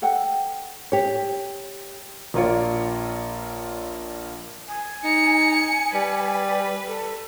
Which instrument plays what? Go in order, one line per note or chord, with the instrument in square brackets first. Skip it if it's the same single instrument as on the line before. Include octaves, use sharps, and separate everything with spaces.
[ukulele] A4 F#5 G5
[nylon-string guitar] G4 C#5
[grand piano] A#1 A#3 F4 C#5 D5
[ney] G#5
[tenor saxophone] D#4 [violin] C#7
[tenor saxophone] G3 [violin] B4
[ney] A4